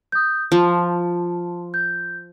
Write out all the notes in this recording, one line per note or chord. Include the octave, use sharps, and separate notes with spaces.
D#6 G6
F3 A5
G6